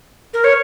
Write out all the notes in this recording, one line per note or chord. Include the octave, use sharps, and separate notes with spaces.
A#4
C#5